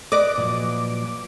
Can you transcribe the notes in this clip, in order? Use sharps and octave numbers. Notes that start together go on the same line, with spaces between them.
B4 D5 D#5 D6
A#2 F3 F#3